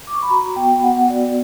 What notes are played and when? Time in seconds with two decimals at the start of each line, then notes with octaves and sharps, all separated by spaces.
0.07 D6
0.15 C#6
0.23 B5
0.30 F#4 A#5
0.56 B3 G5
0.83 B3 F#5
1.10 F#4 D5